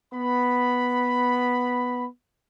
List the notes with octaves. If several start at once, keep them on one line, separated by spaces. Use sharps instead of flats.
B3 B5